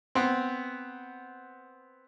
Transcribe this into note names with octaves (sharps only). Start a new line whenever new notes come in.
B3 C4